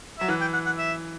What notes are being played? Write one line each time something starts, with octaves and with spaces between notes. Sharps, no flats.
F#3 E5
E3 F#5
G5
F#5
F#5
E5